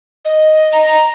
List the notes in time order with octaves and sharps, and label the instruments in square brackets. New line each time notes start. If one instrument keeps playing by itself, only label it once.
[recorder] D#5
[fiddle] A#5